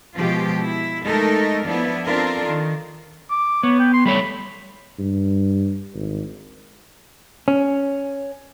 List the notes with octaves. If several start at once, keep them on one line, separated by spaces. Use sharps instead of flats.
B2 F3 G#3 F4 G4
E4
G#3 A3 D#4 A4 A#4
F3 B3 D4 E4
C4 D4 F4 A4 A#4
D#3
D6
B3 C#5
G5
C6
G3 A3 C#5 B5
G2
G#1
C#4